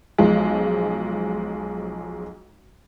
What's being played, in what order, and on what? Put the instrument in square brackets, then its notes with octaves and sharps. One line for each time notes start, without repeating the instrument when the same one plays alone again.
[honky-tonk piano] B1 F3 G#3